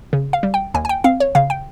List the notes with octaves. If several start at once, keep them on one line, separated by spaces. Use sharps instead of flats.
C#3
F5
G3
G5
D#2 G#5
G#5
G5
C4 F5
C#5
C#3 F5
G5